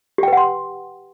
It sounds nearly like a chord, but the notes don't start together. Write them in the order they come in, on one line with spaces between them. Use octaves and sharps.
G4 G5 B4 F#5 C6